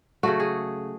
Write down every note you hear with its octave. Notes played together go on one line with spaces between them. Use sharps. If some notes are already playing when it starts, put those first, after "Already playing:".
C#3 F#3 A3 F#4
G#4